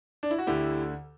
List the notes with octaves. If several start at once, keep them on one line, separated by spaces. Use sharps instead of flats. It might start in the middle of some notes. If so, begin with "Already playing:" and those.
D4
E4
F#4
D2 D3 E4 G4